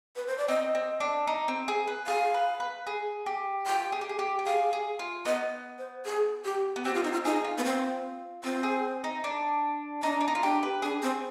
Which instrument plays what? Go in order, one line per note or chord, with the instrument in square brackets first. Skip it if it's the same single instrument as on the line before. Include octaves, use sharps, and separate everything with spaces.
[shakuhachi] B4
C5
D5
[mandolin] C4 [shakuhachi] D#5
[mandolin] C4
D4
D#4
C4
G#4
B4
[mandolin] G#4 [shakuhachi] F5
[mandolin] B4
B4
G#4
G4
[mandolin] F4 [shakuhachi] G5
[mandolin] G#4
G4
G#4
G4
G4
[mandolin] G#4 [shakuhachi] F5
[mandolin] G#4
F4
[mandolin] B3 [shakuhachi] D#5
[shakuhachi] C5
G#4
G4
[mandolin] B3
[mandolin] C4 [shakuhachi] G4
[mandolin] B3 [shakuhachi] F4
[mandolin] C4 [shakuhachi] D#4
[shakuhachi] F4
[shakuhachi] D#4 [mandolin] G#4
[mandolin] F4
[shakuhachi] B3
C4
[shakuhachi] C4 [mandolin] F4
[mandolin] G#4
D#4
D4
[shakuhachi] D4 [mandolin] D#4
[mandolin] D4
D#4
F4
[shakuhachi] D4 [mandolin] G4
[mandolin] B4
[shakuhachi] D4 [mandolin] G#4
[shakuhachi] C4